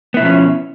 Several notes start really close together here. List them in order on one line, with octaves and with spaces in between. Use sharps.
B3 E4 B2 F3 C#4